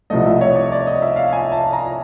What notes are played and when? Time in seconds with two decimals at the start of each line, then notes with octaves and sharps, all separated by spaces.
0.10 C2 C3 F3 A3 D#5
0.26 E5
0.41 C#5
0.56 D5
0.72 D5
0.87 D#5
1.02 E5
1.16 F5
1.33 G#5
1.52 A5
1.73 A#5